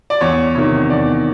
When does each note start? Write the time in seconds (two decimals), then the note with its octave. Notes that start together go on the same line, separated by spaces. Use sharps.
0.10 D5
0.21 E2 C#5
0.55 C3 D#3 C#5
0.90 E2 D5